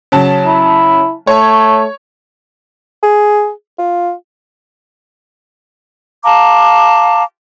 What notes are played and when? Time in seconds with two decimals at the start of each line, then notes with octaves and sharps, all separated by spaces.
0.12 C#3 F#3 A5
0.47 E4
1.27 A3 C#5
3.03 G#4
3.79 F4
6.24 F5 A5 A#5 D6